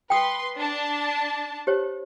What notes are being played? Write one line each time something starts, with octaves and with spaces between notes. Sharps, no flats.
B4 G5 C6 D#6
D4 A5
G4 C5 C#5